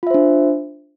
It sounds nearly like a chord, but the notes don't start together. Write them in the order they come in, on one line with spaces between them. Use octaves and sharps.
F4 E5 C5 D4